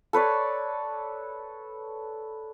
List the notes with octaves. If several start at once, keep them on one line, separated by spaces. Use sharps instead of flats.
A4 B4 C#5 D5